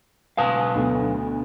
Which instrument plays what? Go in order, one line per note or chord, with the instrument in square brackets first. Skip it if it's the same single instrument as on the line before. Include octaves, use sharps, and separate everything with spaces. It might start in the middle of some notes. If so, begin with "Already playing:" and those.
[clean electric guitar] B1 B4 F5 [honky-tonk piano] G#5 A5 D#6
[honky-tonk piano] D2 B2